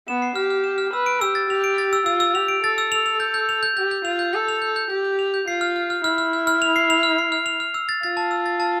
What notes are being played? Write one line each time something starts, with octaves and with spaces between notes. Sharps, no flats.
B3 E7
C7
G4 F6
F6
E7
F6
B4 E6
D7
G4 E6
A6
G4 F7
D7
A6
E6
F4 E6
E6
G4 F7
D7
A4 A6
E6
F7
F7
G6
G6
F7
G6
G4 G6
G6
F4 F7
G6
A4 G6
F7
G6
G6
G4 G6
G6
F7
G6
F4 C7
F6
F6
F6
E4 F6
F6
F6
F6
F7
C7
F7
F6
C7
F6
F7
F6
E6
A6
F4 A6
A5
E6
A6
A5